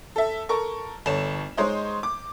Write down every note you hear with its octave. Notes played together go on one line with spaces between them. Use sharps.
A4 E5
A4 A#4 C#6
G1 A4 C#5 E7
G#3 D#4 C5 C#5 D#5
D6